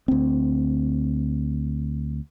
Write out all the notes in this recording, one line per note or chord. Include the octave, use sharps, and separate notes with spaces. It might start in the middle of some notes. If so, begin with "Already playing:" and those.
D2 C4